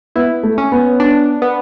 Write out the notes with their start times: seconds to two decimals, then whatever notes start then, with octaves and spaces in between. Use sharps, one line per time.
0.16 B3 E4
0.43 A3
0.58 C#4
0.72 B3
1.00 D4
1.42 B3